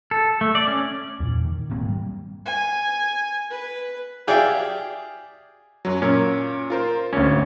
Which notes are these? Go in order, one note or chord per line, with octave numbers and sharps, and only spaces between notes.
A4
A3
D5
C#4
E2 A#2
D#3
D#1 G#2 A#3 C4
G3
G#5
B4
G4 G#4 D5 E5 F5 G5
F#2 F#3
A#2 C#4 A#4
F4 A#4 C5
G#1 D2 C#4